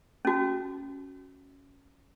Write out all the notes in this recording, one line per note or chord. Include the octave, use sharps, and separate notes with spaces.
C#4 F#4